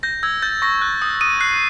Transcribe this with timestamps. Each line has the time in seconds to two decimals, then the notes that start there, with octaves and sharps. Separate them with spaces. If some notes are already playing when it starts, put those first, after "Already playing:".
0.03 G6 A#6
0.23 E6 G#6
0.42 G6 A6
0.62 C#6 A#6
0.82 F#6
1.02 D#6
1.21 D#6 D#7
1.41 F#6 C7